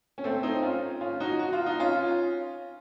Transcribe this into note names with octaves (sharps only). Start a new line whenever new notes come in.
C#4
A3 C4
C4 D#4
C#4 F4
C#4 F4
D#4 F#4
F#4
F4
D#4
C#4 F4